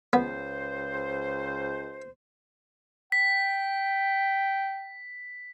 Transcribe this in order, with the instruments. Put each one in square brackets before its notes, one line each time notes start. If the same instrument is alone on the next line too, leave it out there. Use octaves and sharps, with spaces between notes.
[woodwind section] C#2 C5 [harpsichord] B3
[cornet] G5 [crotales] B6